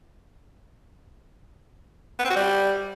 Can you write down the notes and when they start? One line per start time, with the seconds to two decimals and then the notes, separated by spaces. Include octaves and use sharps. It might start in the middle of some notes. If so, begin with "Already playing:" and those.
2.19 B3
2.25 C4
2.30 F#4
2.36 G3